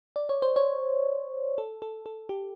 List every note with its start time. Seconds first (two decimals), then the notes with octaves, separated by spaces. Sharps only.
0.16 D5
0.29 C#5
0.42 C5
0.56 C#5
1.58 A4
1.82 A4
2.06 A4
2.29 G4